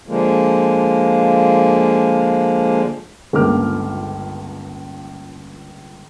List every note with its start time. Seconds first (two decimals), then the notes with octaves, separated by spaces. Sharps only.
0.08 D3 F3 G#3 A#3
3.33 G1 C#2 A#3 D6 F6